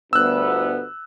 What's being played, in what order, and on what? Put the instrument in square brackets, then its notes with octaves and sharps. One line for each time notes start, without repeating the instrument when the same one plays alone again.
[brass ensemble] G1 D2 B3 [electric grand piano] E6 F#6